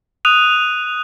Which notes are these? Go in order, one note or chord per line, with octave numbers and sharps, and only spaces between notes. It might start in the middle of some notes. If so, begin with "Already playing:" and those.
D#6 F#6 D#7 F7